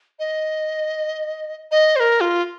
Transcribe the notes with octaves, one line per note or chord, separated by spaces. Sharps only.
D#5
D#5
C5
A#4
F4